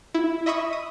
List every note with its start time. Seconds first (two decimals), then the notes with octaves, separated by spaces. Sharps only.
0.14 E4
0.46 D#5 E5 B5 C#6 D#6
0.73 D#6